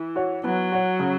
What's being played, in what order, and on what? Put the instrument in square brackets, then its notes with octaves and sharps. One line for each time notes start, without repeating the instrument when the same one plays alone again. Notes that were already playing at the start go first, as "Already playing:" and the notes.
Already playing: [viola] E3
[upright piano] F#4 C#5
[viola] F#3 [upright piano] B3
[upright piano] F#4 C#5
C#3